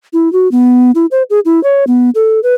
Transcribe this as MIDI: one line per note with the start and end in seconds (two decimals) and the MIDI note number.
0.13 0.31 64
0.33 0.51 66
0.52 0.91 59
0.95 1.06 64
1.11 1.23 72
1.30 1.40 68
1.45 1.62 64
1.63 1.84 73
1.87 2.10 59
2.15 2.40 69
2.43 2.54 71